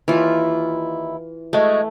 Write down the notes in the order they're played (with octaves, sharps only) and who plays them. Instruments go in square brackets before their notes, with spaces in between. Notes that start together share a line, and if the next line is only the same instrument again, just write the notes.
[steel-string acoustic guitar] D#2 E4 [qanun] E3 F4
[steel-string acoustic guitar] G#3 F#4 G#4 [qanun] A3